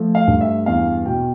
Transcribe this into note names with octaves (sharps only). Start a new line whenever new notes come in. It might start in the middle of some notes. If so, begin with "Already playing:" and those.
Already playing: F3 A3
F5
G2
E5
E2 F5
B2 G5